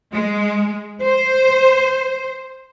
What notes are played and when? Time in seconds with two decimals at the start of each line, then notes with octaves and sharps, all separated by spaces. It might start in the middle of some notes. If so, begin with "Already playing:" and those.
0.14 G#3
1.02 C5